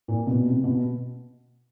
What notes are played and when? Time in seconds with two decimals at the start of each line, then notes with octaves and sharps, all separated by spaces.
0.08 A#2
0.27 B2
0.46 C3
0.64 B2